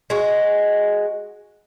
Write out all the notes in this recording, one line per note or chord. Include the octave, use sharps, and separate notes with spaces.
G#3 F#4